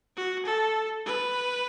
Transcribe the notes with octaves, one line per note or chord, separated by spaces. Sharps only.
F#4
A4
B4